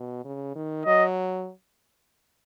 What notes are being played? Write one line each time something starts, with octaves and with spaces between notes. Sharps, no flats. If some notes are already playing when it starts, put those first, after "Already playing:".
Already playing: B2
C#3
D#3
F#3 D#5